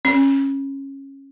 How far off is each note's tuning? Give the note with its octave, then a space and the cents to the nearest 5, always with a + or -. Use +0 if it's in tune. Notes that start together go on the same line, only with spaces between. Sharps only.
C#4 -20